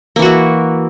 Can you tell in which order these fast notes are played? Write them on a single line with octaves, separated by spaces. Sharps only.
A#3 E3 F#4 E4